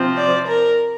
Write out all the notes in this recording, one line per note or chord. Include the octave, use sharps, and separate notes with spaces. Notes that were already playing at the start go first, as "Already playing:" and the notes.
Already playing: C3 F3 C4
D5
A#4